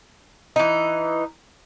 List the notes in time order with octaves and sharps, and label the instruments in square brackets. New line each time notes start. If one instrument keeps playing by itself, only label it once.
[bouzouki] E3 D#4